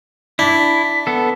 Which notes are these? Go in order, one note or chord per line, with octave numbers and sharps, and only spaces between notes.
D4 E4 B6
B3 A4